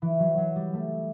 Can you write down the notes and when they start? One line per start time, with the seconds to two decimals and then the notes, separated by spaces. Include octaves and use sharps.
0.02 E3
0.20 F#3
0.38 F#3
0.56 G3
0.74 A3